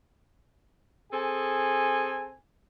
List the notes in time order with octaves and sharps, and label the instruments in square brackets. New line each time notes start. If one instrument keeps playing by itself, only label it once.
[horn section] C4 G#4 A4 G#5